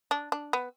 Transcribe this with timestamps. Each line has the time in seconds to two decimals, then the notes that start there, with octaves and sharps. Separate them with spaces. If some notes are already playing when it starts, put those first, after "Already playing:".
0.11 D4
0.32 D4
0.53 B3